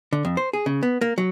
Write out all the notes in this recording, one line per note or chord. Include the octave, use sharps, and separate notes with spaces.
D3
F2
C5
G#4
C#3
B3
A#3
F#3